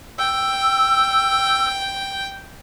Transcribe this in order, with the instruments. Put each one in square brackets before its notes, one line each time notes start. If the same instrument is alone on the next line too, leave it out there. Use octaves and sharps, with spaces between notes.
[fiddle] G5 [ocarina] E6